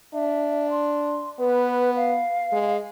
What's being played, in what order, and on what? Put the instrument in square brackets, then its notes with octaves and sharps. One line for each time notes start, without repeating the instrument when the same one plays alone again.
[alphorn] D4 [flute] E5
[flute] C6
[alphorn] B3 [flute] B4
[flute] F5
[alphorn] G#3